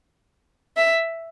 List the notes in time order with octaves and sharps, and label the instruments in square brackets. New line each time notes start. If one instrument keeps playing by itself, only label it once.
[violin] E5